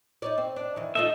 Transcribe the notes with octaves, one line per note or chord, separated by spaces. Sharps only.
D#4 C#5 D5
C4
D4
D#3 E3
A3 D#4 F4 D#5 E5